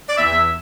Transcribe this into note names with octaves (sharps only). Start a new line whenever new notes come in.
D5
E2 E5